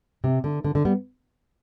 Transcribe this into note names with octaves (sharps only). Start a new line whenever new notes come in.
C3
D3
D3
D3
G3 B3